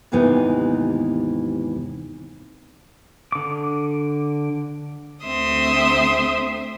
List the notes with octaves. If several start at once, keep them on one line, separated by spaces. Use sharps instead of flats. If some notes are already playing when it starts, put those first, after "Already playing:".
D#2 G#2 C3 E3 B3 D#4
D3 D6
D2 C4 E5 C6 D#6